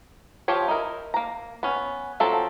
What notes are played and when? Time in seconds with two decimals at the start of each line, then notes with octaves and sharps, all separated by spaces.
0.48 F3 F4 G4 C#5
0.68 D#4 E4 A#4
1.14 A#3 A#5
1.63 B3 C#4
2.20 F3 F#3 C4 A4